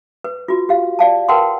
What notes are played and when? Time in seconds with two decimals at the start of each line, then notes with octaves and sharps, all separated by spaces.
0.24 B4
0.48 F4 F#4
0.69 G4 F5
0.99 D5 F5 A5
1.29 A#4 B4 F#5 G5 A5 C6